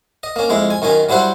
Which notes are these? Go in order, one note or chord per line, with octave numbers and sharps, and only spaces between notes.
D#5
A#3 C#4
F2 G#3 E4
G#5
F#2 D#3 C#4 G#5
F#3 G3 E4 C5 F#5